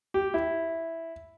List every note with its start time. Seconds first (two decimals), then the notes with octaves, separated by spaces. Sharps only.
0.14 G4
0.34 E4